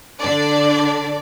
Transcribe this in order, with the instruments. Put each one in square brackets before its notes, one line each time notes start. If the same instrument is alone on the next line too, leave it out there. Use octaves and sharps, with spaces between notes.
[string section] D3 D4 D5